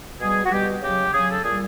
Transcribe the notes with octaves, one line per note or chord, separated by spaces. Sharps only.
B2 G3 G#4
F#4
B2 G3 G4
C#3 F#3 G4
C#3 F#3 G#4
A4
A#2 G3 G#4